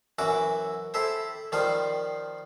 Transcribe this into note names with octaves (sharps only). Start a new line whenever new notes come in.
F#2 E3 F#4 F#5 D6
E4 G4 A4 C5
D#3 F3 G3 F4 C5